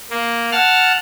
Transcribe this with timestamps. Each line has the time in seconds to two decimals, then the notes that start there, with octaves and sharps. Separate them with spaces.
0.11 A#3
0.52 F#5 A5 F6